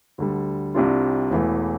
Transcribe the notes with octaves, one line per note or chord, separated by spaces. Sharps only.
D2 D3 G3
C2 C3 G3 D4 F4
E1 E2 E3 A3